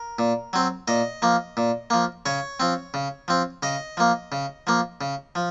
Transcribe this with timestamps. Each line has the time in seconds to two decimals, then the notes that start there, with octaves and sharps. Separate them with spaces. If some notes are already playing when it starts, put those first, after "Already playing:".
Already playing: A#4
0.19 A#2
0.53 F#3 C4
0.88 A#2 D#5
1.22 F3 A#3
1.57 A#2
1.90 F3 A#3
2.26 C#3 C#5
2.60 F3 C4
2.94 C#3
3.28 F3 C4
3.63 C#3 D#5
3.97 F3 A#3
4.32 C#3
4.67 F3 A#3
5.01 C#3
5.35 F3